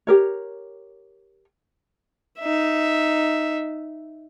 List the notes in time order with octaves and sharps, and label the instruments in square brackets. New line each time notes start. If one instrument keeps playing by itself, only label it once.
[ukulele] G4 A#4 C#5
[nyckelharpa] D#4 E5